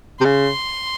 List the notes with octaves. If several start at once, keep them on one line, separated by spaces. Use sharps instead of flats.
C3
C#3 C6